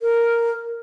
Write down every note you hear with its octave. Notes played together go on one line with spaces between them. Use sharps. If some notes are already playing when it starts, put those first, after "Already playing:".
A#4